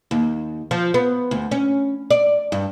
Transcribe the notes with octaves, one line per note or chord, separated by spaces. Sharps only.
D#2
F3
B3
D2
C#4
D5
G2